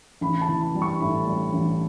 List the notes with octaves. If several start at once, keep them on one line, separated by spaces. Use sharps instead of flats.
A1 B5
A5
E3
B5
G3
C#6
A2 B5
G3
A1